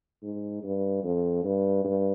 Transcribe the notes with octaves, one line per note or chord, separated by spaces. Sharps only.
G#2
G2
F2
G2
G2